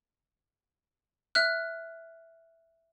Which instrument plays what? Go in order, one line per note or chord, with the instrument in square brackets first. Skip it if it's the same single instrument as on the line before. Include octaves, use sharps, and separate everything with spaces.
[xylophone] E5 F6 F#6